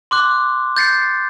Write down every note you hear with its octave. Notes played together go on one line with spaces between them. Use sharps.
C6 D6 F#6
G6 A6 C7 C#7